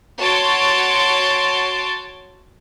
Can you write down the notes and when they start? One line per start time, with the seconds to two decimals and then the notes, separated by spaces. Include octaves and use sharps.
0.18 F#4 C#5 A5 C6 A6 D7